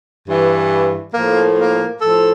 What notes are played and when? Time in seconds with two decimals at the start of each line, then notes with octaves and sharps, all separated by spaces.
0.29 G2 E3
1.14 A2 F3 A#3
1.58 A#3
2.01 A2 F3 A4